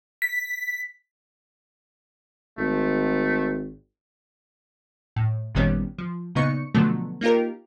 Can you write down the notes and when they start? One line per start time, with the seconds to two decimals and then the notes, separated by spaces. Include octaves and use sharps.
0.22 B6
2.58 G#1 A3
5.16 A2
5.55 G#1 A#2 D#3 G3 B3 C#4
5.98 F3
6.35 A#2 C#3 B3 D#4 C#6 C#7
6.75 B2 D3 F3 F#3 A3 B3
7.21 A#3 D#4 F4 G4 A#4